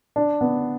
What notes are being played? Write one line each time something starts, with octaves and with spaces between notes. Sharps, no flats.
D4
B3